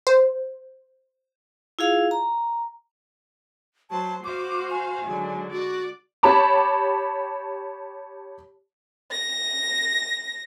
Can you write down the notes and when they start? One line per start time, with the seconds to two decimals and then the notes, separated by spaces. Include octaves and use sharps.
0.07 C5
1.79 E4 F4 G#4 F5
2.11 A#5
3.90 F#3 C5 A5
4.24 F#4 C5 F5 D6
4.71 G#5
5.06 G#2 D3 F#3
5.52 F#4 D5
6.23 G4 C#5 A5 B5 D6
9.11 A#6